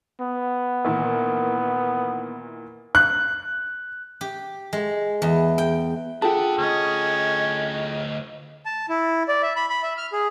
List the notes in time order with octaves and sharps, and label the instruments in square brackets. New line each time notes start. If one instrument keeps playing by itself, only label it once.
[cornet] B3
[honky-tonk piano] A#2 D#3 E3
[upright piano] F#6
[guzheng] G4
G#3
E2
G5
[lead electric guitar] D4 F#5 [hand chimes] F4 A5 [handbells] G#4 A4 G5
[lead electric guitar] D2 D#5 [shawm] C#4
[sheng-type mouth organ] A5
E4
D5
E5
B5
B5
E5
F6
G#4